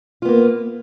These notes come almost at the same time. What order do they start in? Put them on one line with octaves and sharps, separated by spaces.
F4 B3 A#3